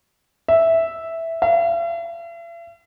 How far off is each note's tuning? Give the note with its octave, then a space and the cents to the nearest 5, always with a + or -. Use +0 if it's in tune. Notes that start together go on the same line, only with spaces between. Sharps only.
E5 -5
E5 +45